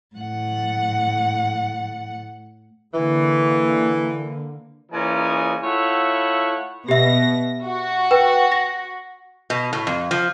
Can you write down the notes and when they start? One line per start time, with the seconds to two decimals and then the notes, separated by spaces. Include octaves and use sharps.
0.16 A2 F#5
2.94 D3 E3 A#3
4.92 A#2 C#3 E3 C#4 D#4 G#5
5.63 A3 E4 F4 C#5 E5 F#5
6.89 B2 G4 E5 A#6
7.65 F#4
8.11 B4 G5
8.52 A#6
9.50 B2
9.73 A2
9.87 F2
10.11 F3